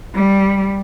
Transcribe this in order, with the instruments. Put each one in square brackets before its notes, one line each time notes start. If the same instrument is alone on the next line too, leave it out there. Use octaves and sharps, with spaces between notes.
[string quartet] G3